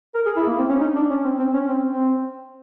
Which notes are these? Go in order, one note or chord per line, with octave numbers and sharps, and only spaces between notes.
A#4
G#4
E4
A#3
C4
C#4
D#4
D4
C#4
C4
C4
C#4
C4
C4